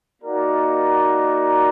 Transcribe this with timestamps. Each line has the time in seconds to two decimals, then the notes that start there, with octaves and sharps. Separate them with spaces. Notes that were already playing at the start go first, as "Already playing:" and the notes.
0.21 A#3 D#4 F#4 A#4 D5